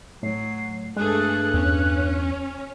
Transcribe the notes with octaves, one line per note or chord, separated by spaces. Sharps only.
A2 F#3 C7
G2 G#3 A3 G#4 A4 F#6
E2 C#4